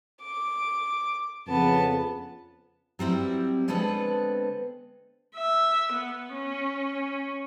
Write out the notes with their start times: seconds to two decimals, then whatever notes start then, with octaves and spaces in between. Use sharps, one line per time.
0.22 D6
1.48 F2 C#3 B3 A5
2.99 F#3 G3 C4 E4
3.68 D3 G#3 B3 C4 A4 B4
5.36 E5
5.92 B3
6.34 C#4